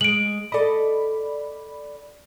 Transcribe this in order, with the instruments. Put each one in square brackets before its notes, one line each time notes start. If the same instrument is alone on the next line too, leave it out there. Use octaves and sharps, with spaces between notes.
[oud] G#3 [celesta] D7 F#7
[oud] A4 D#5 [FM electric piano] D5 B5